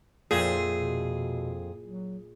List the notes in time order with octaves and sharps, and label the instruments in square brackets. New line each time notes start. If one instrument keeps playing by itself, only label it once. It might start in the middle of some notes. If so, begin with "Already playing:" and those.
[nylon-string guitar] F2 [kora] A#2 C5 E5 [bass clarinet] F3 [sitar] G#4
[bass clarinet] B2
F#3